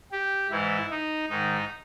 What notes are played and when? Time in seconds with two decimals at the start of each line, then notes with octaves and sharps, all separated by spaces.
0.12 G4
0.50 G#2 E3 E4
0.90 D#4
1.29 G#2 D#3 D#4